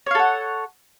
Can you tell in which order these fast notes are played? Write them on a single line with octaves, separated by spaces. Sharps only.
C#5 F5 A4 F#5